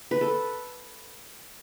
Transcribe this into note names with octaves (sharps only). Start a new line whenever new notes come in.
B4
A4